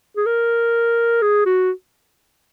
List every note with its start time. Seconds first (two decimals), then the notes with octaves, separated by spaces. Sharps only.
0.16 G#4
0.26 A#4
1.22 G#4
1.46 F#4